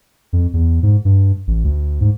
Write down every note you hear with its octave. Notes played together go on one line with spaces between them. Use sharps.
F2
E2
G#2
G2
A1
D2
G#2